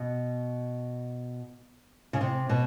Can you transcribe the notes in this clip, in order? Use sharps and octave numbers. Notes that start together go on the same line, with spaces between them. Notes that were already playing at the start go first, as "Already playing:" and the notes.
Already playing: B2
C#3
C3
B2